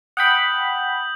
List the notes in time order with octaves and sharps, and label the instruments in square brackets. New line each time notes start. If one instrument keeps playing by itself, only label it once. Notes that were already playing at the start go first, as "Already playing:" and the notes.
[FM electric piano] F#5 G5 B5 [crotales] D#6 G6 F#7